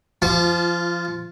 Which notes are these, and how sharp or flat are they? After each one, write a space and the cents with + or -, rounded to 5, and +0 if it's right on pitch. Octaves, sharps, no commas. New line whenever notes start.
F3 -25 F4 +0 A5 -35